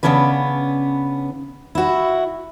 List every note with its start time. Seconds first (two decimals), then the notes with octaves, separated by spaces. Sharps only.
0.03 C#3 A#3 B3 C#4 D4 B4
1.75 E4 F#4